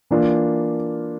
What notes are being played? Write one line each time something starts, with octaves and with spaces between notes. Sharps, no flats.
E3 A#3 D4 F4